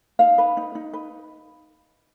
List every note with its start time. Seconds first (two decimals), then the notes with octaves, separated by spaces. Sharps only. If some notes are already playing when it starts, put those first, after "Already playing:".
0.19 D#4 F5
0.38 B4
0.57 D#4
0.75 D#4
0.93 B4